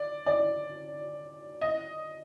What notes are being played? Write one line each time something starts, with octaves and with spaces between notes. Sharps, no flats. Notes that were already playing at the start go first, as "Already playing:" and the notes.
Already playing: D5
D5
D#5